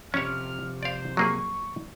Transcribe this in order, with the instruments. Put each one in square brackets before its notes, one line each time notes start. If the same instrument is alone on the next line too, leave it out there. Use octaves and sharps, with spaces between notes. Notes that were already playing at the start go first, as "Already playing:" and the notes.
[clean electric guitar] F2 C3 [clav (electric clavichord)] C#4 C#5 [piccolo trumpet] F6
[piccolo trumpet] C5 [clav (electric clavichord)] D5 F5
[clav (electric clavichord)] F#3 A#3 G#4 [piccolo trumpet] C#6